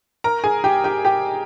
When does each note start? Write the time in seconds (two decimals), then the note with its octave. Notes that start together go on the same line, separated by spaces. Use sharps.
0.24 A#4 A#5
0.44 G#4 G#5
0.64 G4 G5
0.84 G4 G5
1.05 G4 G5